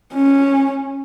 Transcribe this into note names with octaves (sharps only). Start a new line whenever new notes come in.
C#4